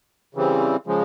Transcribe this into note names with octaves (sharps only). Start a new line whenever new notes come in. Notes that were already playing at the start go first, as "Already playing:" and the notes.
C#3 E3 G3 C4
C#3 F3 G#3